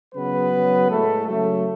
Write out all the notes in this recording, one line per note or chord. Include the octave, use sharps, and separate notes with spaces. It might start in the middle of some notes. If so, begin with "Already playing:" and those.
C#3 F#3 B3 B4
C#3 F#3
A2 G#3 A3 A4
C#3 F#3 A3 A4